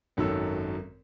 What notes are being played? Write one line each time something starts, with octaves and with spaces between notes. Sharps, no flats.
G#1 F#2 D#3 F#3 A4 E6